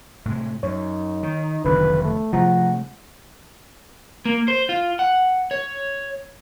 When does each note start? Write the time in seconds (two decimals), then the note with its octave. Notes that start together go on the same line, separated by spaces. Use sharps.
0.25 A2 C3 G#3
0.63 F#2 D#4 C#5
1.23 D#3
1.65 F1 B1 F2 D3 D#3 B4
2.03 A3
2.33 C3 F3 G#3 A3 F#5 A#5
4.25 A#3
4.48 C5
4.69 F4
4.99 F#5
5.51 C#5